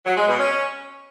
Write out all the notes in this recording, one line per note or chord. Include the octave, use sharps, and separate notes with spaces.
F#3
G#3
B2
C#4